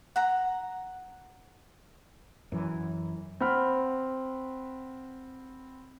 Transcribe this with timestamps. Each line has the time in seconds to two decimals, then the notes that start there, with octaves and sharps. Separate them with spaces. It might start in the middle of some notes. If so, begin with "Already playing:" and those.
0.16 F#5 A#5
2.52 F#2 E3
3.40 C4 F#5 B5 F6